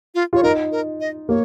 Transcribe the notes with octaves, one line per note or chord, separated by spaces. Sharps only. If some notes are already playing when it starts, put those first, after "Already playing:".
F4
F4 C#5
D#4 A#4
A#4
D#5
A#3 C#5